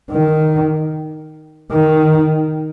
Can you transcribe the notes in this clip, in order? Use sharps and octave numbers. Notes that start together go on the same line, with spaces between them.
D#3
D#3